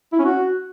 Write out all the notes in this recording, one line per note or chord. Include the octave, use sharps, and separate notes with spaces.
E4
C#4
F#4